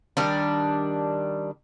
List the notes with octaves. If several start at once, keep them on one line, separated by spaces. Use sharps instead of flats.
D#3 G3 D4